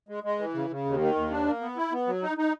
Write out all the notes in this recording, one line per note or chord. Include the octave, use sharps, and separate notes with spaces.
G#3
G#3
E3
C#3
C#3
D#2
D#3
D#2
D4
A#3
B3
E4
B3
F#3
D#4
D#4